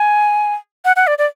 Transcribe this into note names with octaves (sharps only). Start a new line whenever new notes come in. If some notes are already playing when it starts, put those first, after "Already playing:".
Already playing: G#5
F#5
F#5
D5
D5